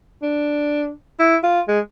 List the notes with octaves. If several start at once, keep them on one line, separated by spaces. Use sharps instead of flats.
D4
E4
F4
G#3